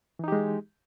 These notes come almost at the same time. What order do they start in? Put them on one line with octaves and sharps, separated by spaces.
E3 D#4 G4 G#3